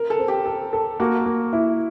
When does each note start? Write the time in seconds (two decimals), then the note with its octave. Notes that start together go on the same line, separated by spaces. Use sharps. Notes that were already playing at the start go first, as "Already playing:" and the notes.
Already playing: A#4
0.10 A4
0.19 C4
0.28 G4
0.46 A4
0.73 A4
1.00 A#3 F#4
1.26 A#3
1.53 E4